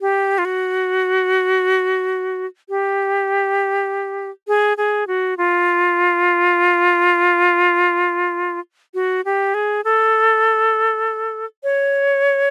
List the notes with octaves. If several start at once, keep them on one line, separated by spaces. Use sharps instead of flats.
G4
F4
F#4
G4
G#4
G#4
F#4
F4
F#4
G4
G#4
A4
C#5